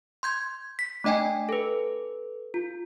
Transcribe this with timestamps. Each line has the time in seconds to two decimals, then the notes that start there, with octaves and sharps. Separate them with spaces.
0.23 C6 G6 G#6
0.79 B6
1.04 A3 D4 D#5 G5 G#5
1.49 A4 B4
2.54 F4